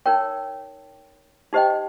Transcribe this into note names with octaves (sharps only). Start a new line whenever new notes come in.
D#4 A#4 C#5 G5
D#4 G4 C5 D#5 G5